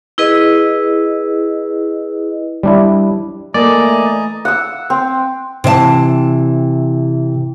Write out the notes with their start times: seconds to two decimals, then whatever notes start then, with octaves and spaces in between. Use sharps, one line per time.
0.18 E4 G#4 B4 D#5
2.63 G3 D4 E4
3.54 E3 A3 A#3 D5 D#5 G#5 A#5
4.45 F#5 E6
4.90 C4
5.64 C3 E3 D5 A5